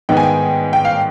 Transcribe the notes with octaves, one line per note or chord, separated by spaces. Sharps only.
G#2 D#3 B3 D#4 G5
G#5
G5
G5
F5